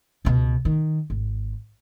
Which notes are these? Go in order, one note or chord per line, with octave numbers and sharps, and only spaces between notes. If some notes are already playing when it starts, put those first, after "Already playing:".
C#2 B2
D#3
G#1